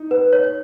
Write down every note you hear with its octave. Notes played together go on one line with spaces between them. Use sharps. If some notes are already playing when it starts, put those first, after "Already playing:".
Already playing: D#4
B4
C#5